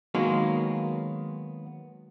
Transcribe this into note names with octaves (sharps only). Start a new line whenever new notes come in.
D#3 F#3 G#3 A#3 B3